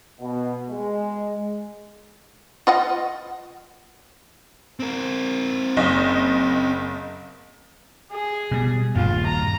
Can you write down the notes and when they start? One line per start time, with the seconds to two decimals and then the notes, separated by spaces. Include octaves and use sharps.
0.20 B2
0.70 G#3
2.67 F4 D#5 F#5
4.80 C4 A#4
5.77 F#1 D#5
8.12 G#4
8.51 B2 G3
8.96 D#1 G2 A#2 F4
9.27 A#5